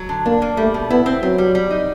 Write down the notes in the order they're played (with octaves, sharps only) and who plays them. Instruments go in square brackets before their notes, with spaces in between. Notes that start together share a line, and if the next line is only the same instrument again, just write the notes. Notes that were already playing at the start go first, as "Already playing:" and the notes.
Already playing: [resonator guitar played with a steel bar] F#3
D3
[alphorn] A#3 [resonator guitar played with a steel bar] D4
[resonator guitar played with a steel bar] A#3
[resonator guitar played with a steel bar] G3 [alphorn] A3
[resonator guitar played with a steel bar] B2
[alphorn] B3 [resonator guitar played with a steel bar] E4
[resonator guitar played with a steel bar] C4
[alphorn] F#3 [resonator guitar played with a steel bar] C4
[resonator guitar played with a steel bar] G3
G3
D#4